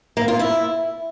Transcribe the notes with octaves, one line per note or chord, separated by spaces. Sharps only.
A#3
F4
E4